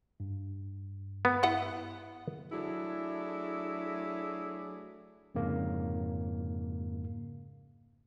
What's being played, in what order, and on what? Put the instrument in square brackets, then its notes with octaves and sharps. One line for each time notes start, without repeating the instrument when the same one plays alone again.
[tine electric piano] G2
[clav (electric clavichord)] B3
[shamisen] E4 B4 F#5
[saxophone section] F#3 A3 D4 E4 G#4
[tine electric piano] F2 G#2 C#3 A#3